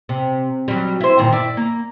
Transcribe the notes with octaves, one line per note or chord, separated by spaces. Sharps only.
C3
F#3 G3
E4 C5
G2 A#2 D#3
E4 D5
A#3